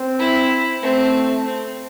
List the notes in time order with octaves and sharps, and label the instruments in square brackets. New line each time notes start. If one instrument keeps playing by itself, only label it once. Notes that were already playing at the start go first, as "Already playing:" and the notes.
Already playing: [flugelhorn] C4
[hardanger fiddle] E4
[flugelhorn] A3 [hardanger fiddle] C4
[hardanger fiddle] C4